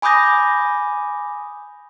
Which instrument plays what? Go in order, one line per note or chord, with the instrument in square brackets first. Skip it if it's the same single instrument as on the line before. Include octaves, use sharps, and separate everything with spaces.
[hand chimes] G#5 B5 D6 D#6 G6 A#6